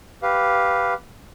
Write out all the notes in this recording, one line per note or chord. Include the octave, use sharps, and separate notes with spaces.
G4 B4 F5